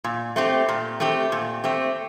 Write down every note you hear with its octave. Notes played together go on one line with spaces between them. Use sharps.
A#2
A3 C4 G4
A#2
A3 C4 G4
A#2
A3 C4 G4